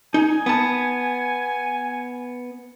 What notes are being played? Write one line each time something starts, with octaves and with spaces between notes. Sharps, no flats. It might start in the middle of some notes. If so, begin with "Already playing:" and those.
D#4 G#5
B3 A5